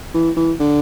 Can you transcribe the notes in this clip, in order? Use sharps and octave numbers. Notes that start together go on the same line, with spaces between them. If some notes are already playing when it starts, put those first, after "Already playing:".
E3
E3
D3